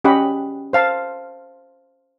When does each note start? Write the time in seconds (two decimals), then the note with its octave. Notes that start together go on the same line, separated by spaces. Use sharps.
0.04 C#4 G4 D#5 F#5 B5
0.73 C5 F5 A5